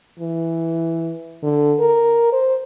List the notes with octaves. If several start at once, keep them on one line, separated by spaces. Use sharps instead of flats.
E3
D3
A#4
C5